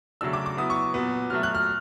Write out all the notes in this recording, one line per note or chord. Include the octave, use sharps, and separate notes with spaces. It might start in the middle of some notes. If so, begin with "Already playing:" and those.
C#3 F#3 A3 D4 E6
D6
D6
F#3 B3 E4 D#6
C#6
A#2 F#3 B3
A#2 F#3 A3 F6
F#6
F6